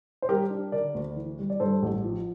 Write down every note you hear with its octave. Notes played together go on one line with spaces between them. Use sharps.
C5
G3 G4 A#4
D4
D3 A#4 D5
D2
E3
G3
D5
G2 A4 C5
A1
F3